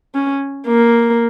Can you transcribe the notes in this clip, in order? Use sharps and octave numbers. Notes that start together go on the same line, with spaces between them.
C#4
A#3